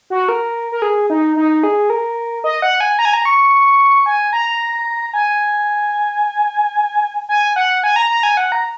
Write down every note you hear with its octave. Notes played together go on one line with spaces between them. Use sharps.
F#4
A#4
A#4
G#4
D#4
D#4
G#4
A#4
D#5
F#5
G#5
A#5
G#5
A#5
C#6
G#5
A#5
G#5
G#5
F#5
G#5
A#5
A#5
G#5
F#5
A#5